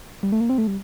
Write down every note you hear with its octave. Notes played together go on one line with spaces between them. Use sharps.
G3
A3
A#3
C4
A3
G3